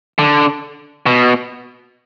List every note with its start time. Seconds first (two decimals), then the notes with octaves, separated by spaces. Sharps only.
0.19 D3
1.06 B2